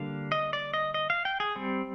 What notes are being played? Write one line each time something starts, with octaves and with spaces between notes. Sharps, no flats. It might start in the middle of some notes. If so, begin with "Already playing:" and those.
Already playing: D3 G3 A#3 D4 F5
D#5
D5
D#5
D#5
F5
G5
G#4
G3 C4